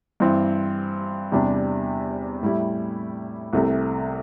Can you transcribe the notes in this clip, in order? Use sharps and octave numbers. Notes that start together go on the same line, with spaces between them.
G2 E3 C4
E2 C3 G3 D4
A2 G3 E4
C2 C3 A3